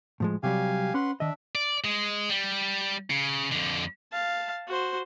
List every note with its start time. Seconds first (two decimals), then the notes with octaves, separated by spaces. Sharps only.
0.20 A2 F3 G#3
0.43 C3 F#3 G3 G4 F5 G#5
0.94 C#4 B4 F#5 C6
1.20 D#3 D4 D#5 E5
1.55 D5
1.84 G#3
2.29 G3
3.10 C#3
3.52 F2 D3
4.12 F5 A5
4.67 F#4 C5